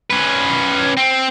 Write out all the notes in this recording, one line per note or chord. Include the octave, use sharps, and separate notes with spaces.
C#4 B4
C4